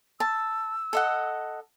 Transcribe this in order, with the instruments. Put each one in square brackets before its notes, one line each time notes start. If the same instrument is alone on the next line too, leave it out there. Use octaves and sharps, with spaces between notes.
[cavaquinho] A5 [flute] E6
[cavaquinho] A4 D#5 F#5